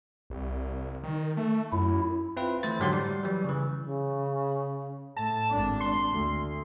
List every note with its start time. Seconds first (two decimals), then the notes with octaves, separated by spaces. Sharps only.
0.30 C2
1.04 D#3
1.37 A3
1.72 F#2 E4
2.37 C4 E4 F4 B4
2.63 E3 A3 E4 C5 A6
2.79 G#2 D3 F#3 G4 F#5 C6
2.93 G3
3.23 E3 F#3 G3
3.44 C#3 E3
3.84 C#3
5.17 A2 A5
5.51 G#1 D4
5.80 C6
6.10 D2